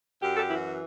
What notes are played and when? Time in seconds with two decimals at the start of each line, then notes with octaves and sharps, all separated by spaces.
0.22 F#2 G4
0.34 A4
0.39 G4
0.48 E3 E4
0.56 F#4